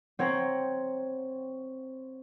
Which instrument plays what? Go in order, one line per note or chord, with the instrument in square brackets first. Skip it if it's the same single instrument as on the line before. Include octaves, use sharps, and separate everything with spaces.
[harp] C4 C#5 F#5 G5 A#5